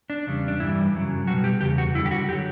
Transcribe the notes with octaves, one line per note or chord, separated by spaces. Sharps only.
D4
E2 C#3 G3
D4
G2 E3 G3 E4
F#2 C#3 F#3
B2 G3 F#4
G4
E2 C#3 G4
F#4
F#2 D3 G3 E4
G4
F#4
D3 F#3 G4